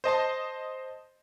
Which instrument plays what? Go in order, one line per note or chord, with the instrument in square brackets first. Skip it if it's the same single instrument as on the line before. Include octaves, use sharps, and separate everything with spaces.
[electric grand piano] C5 D#5 A5 C6